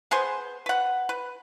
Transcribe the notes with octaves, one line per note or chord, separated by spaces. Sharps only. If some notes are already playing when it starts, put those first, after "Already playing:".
B3 G#4 B4 C5
B4 F#5
B4